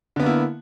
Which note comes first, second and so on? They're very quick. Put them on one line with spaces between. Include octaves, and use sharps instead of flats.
D3 B3 A#3 E4